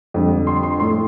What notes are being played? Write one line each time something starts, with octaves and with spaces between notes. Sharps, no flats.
F2 D3 G3
C6
C6
A2 A3 C6